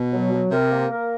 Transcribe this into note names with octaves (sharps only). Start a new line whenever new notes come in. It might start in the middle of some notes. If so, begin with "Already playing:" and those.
Already playing: B2
F#3
F#3
C3 A#4
A#3
A#4